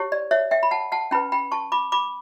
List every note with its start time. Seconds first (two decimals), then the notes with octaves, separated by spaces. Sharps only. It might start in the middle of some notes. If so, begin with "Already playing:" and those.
Already playing: E4 G4 C#5
0.12 D5
0.31 C#5 E5
0.51 E5 G5
0.63 B5
0.71 F#5 A5
0.92 F#5 A5
1.11 C#4 E4 B4 G5 B5
1.32 G5 B5
1.52 A5 C#6
1.72 B5 D6
1.92 B5 D6